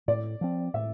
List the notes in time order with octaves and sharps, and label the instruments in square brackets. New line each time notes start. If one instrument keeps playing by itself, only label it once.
[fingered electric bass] A2 [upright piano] D5
[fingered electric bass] F3 C4
[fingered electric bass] A2 [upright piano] E5